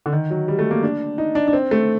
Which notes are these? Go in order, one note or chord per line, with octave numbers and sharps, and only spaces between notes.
D3
D#3
F#3
G3
A3
A#3
D4
D#4
D4
D4
C4
A3